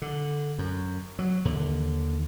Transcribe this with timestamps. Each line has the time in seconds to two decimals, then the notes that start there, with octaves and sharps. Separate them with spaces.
0.02 D3
0.58 F#2
1.19 F#3
1.45 D#2 D3